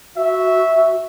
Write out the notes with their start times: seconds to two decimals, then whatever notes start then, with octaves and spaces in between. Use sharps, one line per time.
0.17 F#4 E5